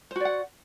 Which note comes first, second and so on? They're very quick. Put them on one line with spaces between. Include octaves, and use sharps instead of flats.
C5 F#4 D5 F#5